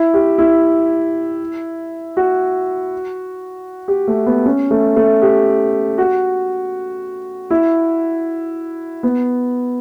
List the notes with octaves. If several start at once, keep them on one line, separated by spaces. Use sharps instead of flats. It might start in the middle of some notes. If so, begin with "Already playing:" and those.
Already playing: E4
G4
E4
F#4
G4
A3
B3
C#4
A3
A3
G4
F#4
E4
B3